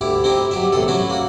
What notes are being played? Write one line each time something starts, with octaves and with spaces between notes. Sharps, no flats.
D2 E4 G4
C4 D#4 E4 G4
F#3 G4 E5
A1 E2 C3 A4
F#3 C#4 E4 F#4
A#3 F#4